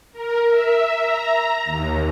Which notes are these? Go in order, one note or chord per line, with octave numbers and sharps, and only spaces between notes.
A#4
E5
A#5
D#2